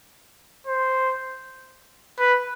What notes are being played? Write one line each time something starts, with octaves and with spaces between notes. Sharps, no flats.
C5
B4